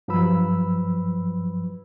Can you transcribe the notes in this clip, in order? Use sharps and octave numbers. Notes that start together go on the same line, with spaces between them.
G2 F3 F#3 B4 B5 E6